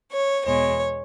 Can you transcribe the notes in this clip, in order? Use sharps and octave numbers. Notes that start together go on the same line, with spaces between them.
C#5
E2 B2 G#3 C#5